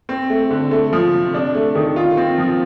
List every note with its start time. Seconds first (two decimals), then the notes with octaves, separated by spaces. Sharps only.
0.09 C4
0.30 A3
0.50 D3
0.71 A3
0.93 F3
1.13 C3
1.34 D4
1.55 A3
1.75 D#3
1.96 F4
2.17 C4
2.38 F3